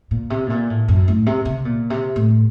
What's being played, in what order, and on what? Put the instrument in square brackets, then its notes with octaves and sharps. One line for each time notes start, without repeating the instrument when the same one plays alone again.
[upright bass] A#2
C3
A2
A#2
A2
F#2
A2
C3
C3
A#2
C3
A2